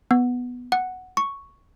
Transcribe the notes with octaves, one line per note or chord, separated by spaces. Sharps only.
B3
F#5
C#6